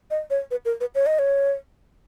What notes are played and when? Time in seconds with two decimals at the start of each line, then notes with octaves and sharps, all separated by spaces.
0.11 D#5
0.30 C#5
0.51 B4
0.65 A#4
0.81 B4
0.95 C#5
1.06 D#5
1.19 C#5